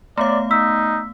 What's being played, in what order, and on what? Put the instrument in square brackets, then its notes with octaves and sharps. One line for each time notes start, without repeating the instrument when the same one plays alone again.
[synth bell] A3 B3 F5 [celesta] C#5 A#5 [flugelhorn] D5
[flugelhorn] D#4 [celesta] E6 B6